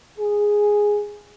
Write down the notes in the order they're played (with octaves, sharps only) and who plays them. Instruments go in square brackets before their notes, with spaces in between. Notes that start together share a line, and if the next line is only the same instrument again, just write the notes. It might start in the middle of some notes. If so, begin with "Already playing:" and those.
[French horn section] G#4